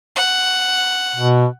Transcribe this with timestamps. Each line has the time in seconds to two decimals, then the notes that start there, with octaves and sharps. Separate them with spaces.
0.16 F#5
1.16 B2